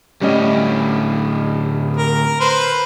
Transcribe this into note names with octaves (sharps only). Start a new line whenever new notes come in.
D2 A2 G3 C#4 D#5
A#4
B4 C5